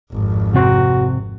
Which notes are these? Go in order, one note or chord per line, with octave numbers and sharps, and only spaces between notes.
G#1 F2
C3 C4 F#4